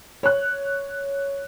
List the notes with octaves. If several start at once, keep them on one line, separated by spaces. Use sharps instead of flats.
C#5 F#6